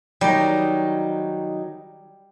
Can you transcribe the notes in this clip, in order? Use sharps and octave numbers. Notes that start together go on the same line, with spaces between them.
D#3 F#3 G3 D#4